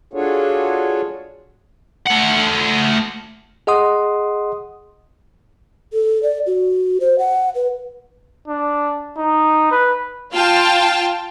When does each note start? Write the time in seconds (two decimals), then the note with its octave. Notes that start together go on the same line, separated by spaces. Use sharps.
0.13 D4 F4 F#4 G#4 A4 C#5
2.06 A3 F#5
3.67 G#4 D#5 F#5 C6 D#6
5.93 A4
6.23 D5
6.46 F#4
7.00 C5
7.19 F#5
7.55 B4
8.48 D4
9.18 D#4
9.71 B4
10.32 F4 F5 G5 A5